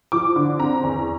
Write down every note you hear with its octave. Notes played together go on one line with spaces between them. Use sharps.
F3 D6
D3
C4 A#5
E2